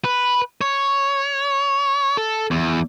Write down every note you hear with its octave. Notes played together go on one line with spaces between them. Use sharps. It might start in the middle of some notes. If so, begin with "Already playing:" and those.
B4
C#5
A4
E2